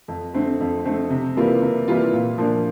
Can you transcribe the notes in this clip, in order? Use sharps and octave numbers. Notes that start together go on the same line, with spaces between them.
F2
D3 A3 C4
F2
D3 A3 C4
C3
E3 G3 A#3 F4
C3
E3 G3 A#3 F4
A#2
F3 A#3 D4